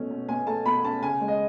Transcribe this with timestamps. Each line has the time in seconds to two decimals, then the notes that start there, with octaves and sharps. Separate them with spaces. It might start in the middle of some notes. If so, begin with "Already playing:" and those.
Already playing: B2 A3 C#4
0.10 B2
0.29 B2 G#5
0.47 A3 A5
0.65 B2 B5
0.84 C#4 A5
1.02 C#3 G#5
1.20 G#3
1.28 D#5